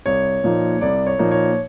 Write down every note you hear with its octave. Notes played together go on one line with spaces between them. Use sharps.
C2 C#5
A#2 F3 A#3 D#4
C2 D5
C#5
A#2 F3 A#3 D#4
C#5